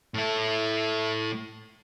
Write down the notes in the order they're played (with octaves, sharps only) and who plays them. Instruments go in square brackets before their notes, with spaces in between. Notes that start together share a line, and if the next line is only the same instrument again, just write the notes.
[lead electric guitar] A2 A3